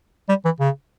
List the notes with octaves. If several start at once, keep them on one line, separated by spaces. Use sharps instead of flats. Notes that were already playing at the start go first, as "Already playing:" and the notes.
G3
E3
C#3